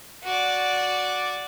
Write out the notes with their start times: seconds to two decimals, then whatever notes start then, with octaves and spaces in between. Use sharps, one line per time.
0.23 F#4 D5